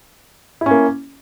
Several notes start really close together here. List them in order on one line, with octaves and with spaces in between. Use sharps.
E4 C#4 A#3